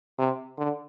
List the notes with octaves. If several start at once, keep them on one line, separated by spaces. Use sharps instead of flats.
C3
D3